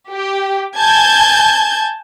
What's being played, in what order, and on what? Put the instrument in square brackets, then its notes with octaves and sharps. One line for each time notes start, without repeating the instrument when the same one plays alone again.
[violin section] G4
G#5 A5 G6 G#6